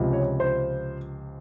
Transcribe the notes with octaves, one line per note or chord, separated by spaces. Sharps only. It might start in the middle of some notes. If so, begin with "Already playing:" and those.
Already playing: C#2 C3 F3
C#5
C5